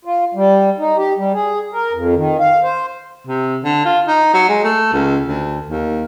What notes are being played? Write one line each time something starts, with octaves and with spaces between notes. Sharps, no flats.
F4
G3
D#4
G4
G3
G#4
A#4
F2
D#3
F5
C5
C3
D3
F4
D#4
F#3
G#3
A3
C#2
D2
D#2